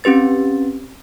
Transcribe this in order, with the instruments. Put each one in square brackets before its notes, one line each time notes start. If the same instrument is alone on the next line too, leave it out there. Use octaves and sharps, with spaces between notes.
[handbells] C4 C#4 G4 B4 A6